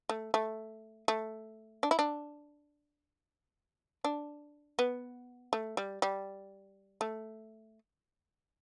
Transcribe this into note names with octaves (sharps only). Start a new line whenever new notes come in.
A3
A3
A3
D4
E4
D4
D4
B3
A3
G3
G3
A3